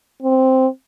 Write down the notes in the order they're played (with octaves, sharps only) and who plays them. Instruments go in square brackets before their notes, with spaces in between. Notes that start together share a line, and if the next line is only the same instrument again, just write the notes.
[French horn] C4